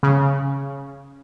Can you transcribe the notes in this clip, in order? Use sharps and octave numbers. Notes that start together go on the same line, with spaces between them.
C#3